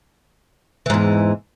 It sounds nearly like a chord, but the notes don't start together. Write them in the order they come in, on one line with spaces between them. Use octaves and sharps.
E3 G#2 E2